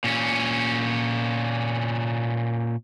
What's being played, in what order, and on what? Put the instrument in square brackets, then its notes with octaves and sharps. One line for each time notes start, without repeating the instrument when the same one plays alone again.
[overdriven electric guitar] A#2 C#4